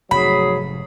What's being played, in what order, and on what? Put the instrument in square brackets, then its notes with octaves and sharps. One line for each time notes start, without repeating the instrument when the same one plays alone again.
[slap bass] F1 G#2 [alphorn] F#3 [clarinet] G#4 [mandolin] B5